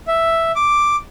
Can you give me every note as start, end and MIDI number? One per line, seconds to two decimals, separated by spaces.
0.08 0.52 76
0.56 0.96 86